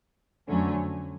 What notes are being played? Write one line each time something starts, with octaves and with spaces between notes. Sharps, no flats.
F2 D3 F#3 A3 C#4